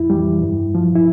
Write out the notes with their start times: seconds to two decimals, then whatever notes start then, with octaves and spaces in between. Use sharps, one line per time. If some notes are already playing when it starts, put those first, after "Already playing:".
Already playing: F2 E4
0.10 E3 G3
0.42 G2
0.75 F3
0.95 E4